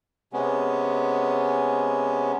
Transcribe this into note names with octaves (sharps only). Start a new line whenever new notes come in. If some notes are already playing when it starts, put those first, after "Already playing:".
C3 G#3 B3 C#4